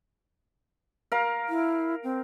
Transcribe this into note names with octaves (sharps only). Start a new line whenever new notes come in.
A#4 F5
E4
C4